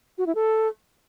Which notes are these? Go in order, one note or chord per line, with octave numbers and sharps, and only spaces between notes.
F#4
E4
A4